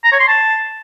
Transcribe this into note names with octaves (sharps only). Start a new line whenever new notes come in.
A#5
C#5
C6
A5